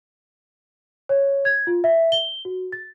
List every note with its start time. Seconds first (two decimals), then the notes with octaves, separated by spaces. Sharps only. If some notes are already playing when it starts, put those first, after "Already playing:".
1.09 C#5
1.45 G#6
1.67 F4
1.84 E5
2.12 G7
2.45 F#4
2.72 A6